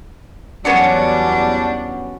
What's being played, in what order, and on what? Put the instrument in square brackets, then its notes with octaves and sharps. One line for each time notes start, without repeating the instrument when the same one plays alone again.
[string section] E2 F#3 G3 [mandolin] B3 C#4 F#4 [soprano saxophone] D4